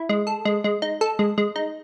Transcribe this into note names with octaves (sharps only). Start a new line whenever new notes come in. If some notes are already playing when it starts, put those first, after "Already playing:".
Already playing: E4
G#3
A4
G#3
G#3
D#4
A4
G#3
G#3
D#4